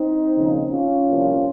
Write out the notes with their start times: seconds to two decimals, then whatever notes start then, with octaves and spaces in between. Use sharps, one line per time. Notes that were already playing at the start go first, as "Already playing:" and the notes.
Already playing: C4 D#4
0.37 D#2 C#3 F3
0.72 C#4 F4
1.08 C2 A#2 F3